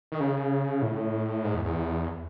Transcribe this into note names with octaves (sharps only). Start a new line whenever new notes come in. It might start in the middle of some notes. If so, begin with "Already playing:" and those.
D#3
C#3
A2
G#2
E2
E2